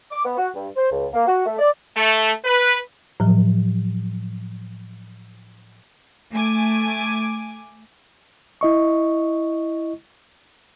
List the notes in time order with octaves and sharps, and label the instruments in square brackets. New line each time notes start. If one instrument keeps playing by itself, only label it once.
[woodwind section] D6
B3
F#4
G2
C5
C#2
A#3
F#4
A3
D5
[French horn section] A3
B4
[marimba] A2 F3 F#3
[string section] A3 G#5 D6
[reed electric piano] E4 D#5 C#6